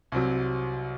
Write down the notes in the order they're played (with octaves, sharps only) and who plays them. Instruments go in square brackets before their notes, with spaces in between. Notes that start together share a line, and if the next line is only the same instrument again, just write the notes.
[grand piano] C2 C3 F#3